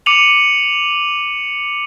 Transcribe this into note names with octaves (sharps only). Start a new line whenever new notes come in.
D6 C#7 D#7 F7 F#7